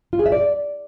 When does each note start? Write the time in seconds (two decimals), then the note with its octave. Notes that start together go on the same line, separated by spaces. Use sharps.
0.13 F4
0.19 G#4
0.26 E5
0.32 D5